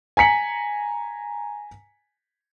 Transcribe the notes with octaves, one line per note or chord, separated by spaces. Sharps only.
G#5 A#5 B6 C#7 F#7